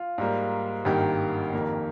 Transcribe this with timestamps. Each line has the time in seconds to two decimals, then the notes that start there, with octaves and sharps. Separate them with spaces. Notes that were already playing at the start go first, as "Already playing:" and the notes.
Already playing: F4
0.18 G#2 G3 A#3
0.85 G#1 G2 D#3 A#3 G4
1.53 F2 D#3 A#3